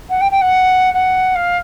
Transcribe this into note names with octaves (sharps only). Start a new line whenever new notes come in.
F#5
G5
G5
F#5
F#5
F5